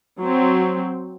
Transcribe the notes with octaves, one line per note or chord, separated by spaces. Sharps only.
F#3 C4